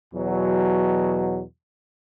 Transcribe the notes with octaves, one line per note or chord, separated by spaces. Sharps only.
E2 B2 F#3